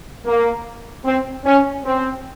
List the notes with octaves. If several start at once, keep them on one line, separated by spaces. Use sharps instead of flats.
A#3
C4
C#4
C4